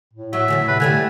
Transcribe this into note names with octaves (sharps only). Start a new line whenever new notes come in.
A2
F#3 E5
E2 A2 D3 F#3
C3 B4
D3 G3 A3 B3 G#5